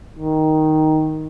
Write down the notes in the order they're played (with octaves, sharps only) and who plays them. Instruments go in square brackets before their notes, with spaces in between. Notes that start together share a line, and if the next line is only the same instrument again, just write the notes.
[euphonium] D#3